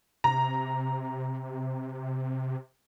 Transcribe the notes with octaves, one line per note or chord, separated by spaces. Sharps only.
C3 A#5